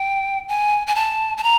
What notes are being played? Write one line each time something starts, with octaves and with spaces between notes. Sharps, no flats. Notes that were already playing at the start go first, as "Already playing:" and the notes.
Already playing: G5
G#5
G#5
A5
A5
A#5